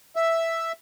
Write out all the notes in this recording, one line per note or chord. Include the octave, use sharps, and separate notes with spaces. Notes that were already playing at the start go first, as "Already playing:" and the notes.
E5